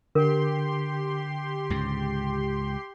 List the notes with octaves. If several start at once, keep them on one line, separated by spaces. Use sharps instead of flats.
D3 G4 A#4 C6
C#2 G#2